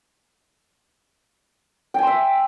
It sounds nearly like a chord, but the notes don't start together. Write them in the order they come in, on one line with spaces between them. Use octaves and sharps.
G5 G#5 C6 E5